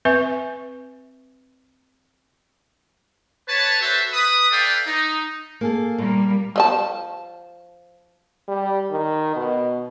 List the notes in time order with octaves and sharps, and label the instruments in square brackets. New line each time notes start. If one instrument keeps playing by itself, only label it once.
[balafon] C4 B4 E5 G#5 C#6
[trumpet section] B4 C#5 A5
F#4 A4 B4 C5 E5
B4 D#6
A4 B4 D5 E5 F5 G5
D#4
[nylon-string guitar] A#3 G#4 A4
[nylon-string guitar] A#2 [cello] G3 A#3
[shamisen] F3 D#5 A5
[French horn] G3
D#3
B2